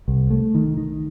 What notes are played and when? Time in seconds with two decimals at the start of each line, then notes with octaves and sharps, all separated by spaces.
0.08 C2
0.31 A3
0.55 D#3
0.77 D#3